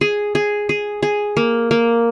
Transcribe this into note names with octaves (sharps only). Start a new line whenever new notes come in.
G#4
G#4
G#4
G#4
A#3
A#3